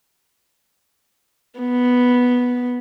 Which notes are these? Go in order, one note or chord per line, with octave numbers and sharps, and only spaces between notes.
B3